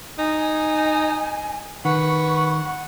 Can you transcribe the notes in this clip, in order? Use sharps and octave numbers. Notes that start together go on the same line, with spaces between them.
D#4 G#5
D#3 B4 F#5 C#6